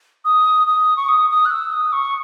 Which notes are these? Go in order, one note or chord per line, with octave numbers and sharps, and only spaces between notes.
D#6
D#6
C#6
D#6
D#6
F#6
E6
D#6
C#6